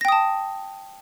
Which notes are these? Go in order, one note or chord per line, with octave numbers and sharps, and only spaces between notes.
G5 A5 D#6 A#6